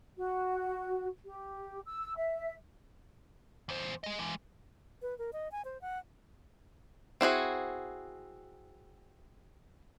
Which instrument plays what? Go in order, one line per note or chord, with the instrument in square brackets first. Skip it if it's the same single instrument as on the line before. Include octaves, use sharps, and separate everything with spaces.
[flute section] F#4
G4
E6
E5
[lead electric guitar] E2 C5
G#3 D#5
E3 G#3
[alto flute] B4
A#4
D#5
G#5
C5
F#5
[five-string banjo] C4 E4 F#4 G#4